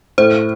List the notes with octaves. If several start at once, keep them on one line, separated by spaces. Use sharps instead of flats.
A2 C5